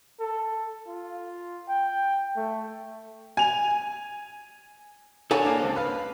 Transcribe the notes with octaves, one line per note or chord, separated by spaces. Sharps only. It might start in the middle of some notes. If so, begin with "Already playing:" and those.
A4
F4
G5
A3
G#5 F7
D4 A4 C#5 G#5
A#3 D4
C#2 C4
B4 F5